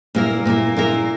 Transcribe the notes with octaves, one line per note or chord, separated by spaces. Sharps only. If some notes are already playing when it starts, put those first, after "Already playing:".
A#2 A#3 E4 A#4
A#2 A#3 E4 A#4
A#2 A#3 E4 A#4